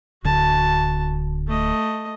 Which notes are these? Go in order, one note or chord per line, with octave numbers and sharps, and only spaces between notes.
D1 D3 F#4 A5
A3 D#5